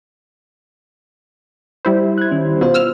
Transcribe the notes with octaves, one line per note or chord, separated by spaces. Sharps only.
G3 E4 C5
F#6 G#6
D#3 C#4
B2 B3 F4 C5
E6 F6